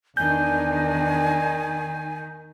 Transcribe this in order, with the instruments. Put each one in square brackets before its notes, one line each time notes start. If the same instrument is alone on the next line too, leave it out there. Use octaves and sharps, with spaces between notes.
[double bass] E2 D4 [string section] D#3 [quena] G#5 [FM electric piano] G6